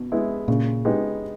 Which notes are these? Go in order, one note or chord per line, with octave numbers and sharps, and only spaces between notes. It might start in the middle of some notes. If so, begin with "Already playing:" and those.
Already playing: B2
G#3 B3 E4
A#2 C#3
G#3 B3 D#4 G4